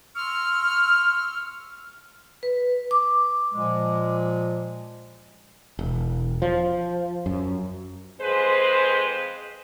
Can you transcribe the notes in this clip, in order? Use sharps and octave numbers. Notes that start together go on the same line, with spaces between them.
C6 C#6 E6 F6
B4
D6
A#2 F3 G#3
E1
F3
F#2
F2 G#3 G#4 B4 C5